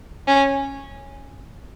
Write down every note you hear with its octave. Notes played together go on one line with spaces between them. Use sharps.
C#4